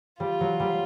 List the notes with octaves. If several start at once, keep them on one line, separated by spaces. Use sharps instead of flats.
G3 F4
F#3
G3